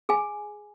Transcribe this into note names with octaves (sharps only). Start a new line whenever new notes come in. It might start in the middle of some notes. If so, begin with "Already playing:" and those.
G#4 G#5